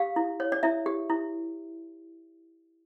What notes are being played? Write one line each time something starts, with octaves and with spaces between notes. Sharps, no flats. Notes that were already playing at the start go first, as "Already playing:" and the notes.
Already playing: G4 F5
E4
C#5
D5
E4 E5
G4
E4